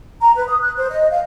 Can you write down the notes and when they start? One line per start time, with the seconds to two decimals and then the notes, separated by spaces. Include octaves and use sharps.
0.21 A#5
0.36 B4
0.48 D#6
0.61 F#6
0.77 C5
0.89 D#5
1.10 F5